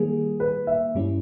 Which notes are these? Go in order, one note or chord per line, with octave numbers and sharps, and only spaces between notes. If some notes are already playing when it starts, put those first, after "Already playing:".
Already playing: D#3 G3 A#3 G#4
B4
E5
G2 G3 C#4 E4